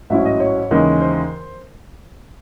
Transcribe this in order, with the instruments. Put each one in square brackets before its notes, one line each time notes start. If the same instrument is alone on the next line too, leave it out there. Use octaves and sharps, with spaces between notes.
[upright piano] A1 G#2 F#3 C#4 E4 E5
D#5
C#5
D#2 C#3 E3 G#3 D#4
C5